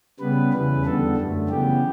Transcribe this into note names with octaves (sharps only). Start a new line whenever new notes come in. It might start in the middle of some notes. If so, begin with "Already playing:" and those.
C#3 G3 B3 B4
E2 C#3 E3 B4
E2 D3 G3 B3 A4
F#2 D3 A3
C#3 E3 B3 G4